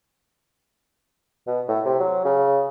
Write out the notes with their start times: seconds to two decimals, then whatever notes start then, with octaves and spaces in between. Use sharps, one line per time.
1.47 B2
1.69 A2
1.85 C3
2.00 F#3
2.25 C#3